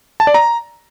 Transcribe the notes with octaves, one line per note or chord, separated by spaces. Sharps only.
A5
D5
A#5